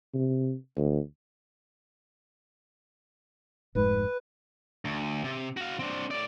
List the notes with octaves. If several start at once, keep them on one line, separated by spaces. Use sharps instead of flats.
C3
D2
F1 G#2 G#3 B4
D2
C3
F#4 F5
C4 D4
A2 D5